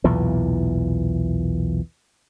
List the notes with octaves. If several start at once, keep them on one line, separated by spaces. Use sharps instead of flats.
B1 E2 A#2 E3